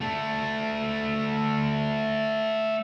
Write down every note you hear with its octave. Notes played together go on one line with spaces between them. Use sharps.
A3 D4